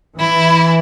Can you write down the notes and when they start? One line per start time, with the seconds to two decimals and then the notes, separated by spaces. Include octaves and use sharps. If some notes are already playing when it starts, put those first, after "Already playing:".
0.19 E3 E4